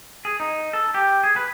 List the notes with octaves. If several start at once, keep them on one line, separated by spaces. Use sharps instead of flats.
G#4
D#4
A4
G4
G#4
B4